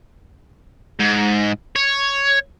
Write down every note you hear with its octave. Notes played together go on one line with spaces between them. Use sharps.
G#2
C#5